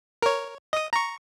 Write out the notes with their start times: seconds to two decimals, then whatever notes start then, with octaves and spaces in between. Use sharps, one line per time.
0.22 A#4 C#5
0.73 D#5 D#6
0.93 A#5 C#6